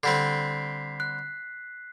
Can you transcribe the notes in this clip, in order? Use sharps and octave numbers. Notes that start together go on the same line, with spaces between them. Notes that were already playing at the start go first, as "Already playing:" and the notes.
D3 G3 C4 B6 C7
F#6